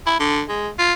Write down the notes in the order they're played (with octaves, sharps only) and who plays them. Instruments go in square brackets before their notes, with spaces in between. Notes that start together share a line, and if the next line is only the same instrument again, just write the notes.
[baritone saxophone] E4
D3
G#3
F4